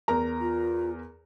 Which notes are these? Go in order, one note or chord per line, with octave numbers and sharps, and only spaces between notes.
E2 A#4 A#5
F4